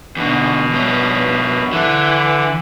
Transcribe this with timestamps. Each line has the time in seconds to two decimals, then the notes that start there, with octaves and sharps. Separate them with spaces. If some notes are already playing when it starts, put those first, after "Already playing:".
0.17 E2 B2 D3
0.73 G2 C#4
1.73 D3 E3